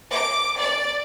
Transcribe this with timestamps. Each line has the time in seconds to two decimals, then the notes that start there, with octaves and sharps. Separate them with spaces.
0.11 D6
0.57 D5